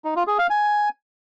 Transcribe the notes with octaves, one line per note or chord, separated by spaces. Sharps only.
D#4
F4
G#4
F5
G#5